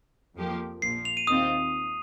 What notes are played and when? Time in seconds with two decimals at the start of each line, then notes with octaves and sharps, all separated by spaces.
0.36 F2 F3 A#3 G4
0.82 A#1 A#2 F3 C7
1.05 F7
1.17 D#7
1.27 D#2 D#3 C4 F4 D#6